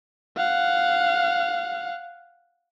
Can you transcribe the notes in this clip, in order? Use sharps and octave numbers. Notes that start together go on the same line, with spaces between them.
F5 F#5